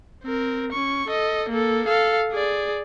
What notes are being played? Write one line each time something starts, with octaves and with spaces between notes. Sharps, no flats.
C4 A#4
C#4 C#6
A4 D#5
A#3 A4
A4 F5
G#4 D5